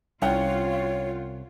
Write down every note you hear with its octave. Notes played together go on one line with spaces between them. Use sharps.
C2 C#4 F4 C#5 F#5 G5